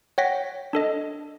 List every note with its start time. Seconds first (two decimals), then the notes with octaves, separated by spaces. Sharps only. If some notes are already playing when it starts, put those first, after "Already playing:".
0.18 C#5 F#5 G5 A#6 B6
0.73 D4 A4 D#5